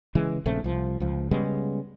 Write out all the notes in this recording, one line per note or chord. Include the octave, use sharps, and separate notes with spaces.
C#3 E3 G#3
A#1 C#3 A3 C4
C2 F3
C#2 F3
C#3 G3 G#3 B3